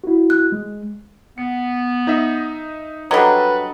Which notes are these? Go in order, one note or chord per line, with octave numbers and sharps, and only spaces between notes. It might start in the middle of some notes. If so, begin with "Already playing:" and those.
E4 F#4
F#6
G#3
B3 C#7
D#4 D#5 E5
F#3 G3 D4 A4 B4 D#5